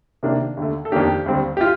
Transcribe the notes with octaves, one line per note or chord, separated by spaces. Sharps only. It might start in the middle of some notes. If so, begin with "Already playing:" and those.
C3 D#3 A#3 D4
D#2 D3 A3
A4
F2 D#3 A#3 D4 G4
D#2 D3 G3 C4
G4
F4